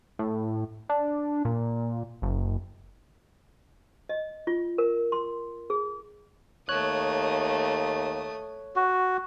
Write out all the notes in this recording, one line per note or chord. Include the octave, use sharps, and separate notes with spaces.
A2
D4
A#2
F#1
D#5
F4
A#4
C6
G#4
D#2 A3 C#5 D#6 F#6
F#4